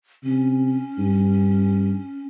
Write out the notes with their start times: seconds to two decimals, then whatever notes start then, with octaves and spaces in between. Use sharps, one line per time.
0.24 C3 C#4
0.98 G2